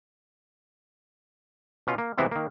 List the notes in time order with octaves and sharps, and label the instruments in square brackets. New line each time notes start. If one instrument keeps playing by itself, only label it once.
[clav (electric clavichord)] B2 C#4 F4
A#3
C3 E3 G#3 B3 C4 E4
D#3 A#3